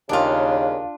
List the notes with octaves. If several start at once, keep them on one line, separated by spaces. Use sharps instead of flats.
D#2 C#3 D4 F4